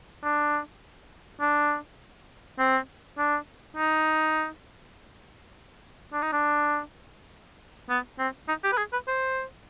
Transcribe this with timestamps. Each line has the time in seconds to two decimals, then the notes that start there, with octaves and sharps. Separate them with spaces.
0.23 D4
1.40 D4
2.59 C4
3.18 D4
3.76 D#4
6.13 D4
6.22 D#4
6.32 D4
7.89 B3
8.19 C4
8.48 D#4
8.64 G4
8.72 B4
8.78 G#4
8.93 B4
9.07 C5